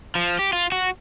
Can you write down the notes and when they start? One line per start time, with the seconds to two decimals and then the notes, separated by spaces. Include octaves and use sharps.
0.15 F3
0.39 G4
0.53 F4
0.72 F#4